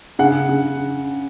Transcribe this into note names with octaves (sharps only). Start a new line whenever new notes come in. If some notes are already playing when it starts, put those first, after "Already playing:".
C#3 F#5
C#3